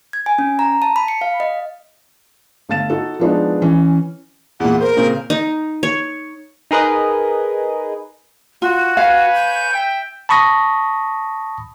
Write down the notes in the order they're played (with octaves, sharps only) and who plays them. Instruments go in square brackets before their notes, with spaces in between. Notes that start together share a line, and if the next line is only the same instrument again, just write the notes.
[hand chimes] G#6
G#5
C#4
A#5
A5
B5
C#7
F5
D#5
[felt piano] G1 A3 F5 A6 E7
D#4 F#4 A4
F3 G#3 B3 D4 D#4
E3 C#4
[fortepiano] E2 A#2 [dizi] F#5
[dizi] A#4 [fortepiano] C5
[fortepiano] A#2 C#3 C4
[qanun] D#4
C#5
[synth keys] D#4 G#4 A#4 B4 D#5
[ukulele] F4 [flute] F#4
[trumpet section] B4 C#5 G#5 [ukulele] F5
[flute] G6
[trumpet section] E5 G5
[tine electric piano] A5 B5 C#6 D#6 A#6